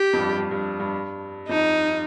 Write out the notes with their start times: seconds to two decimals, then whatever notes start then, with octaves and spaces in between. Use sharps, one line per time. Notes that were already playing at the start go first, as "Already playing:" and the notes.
Already playing: G4
0.13 F2
0.19 G2
0.38 G2
0.51 G2
0.79 G2
1.48 F2 D#4